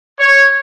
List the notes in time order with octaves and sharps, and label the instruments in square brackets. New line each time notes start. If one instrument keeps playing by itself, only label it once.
[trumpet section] C#5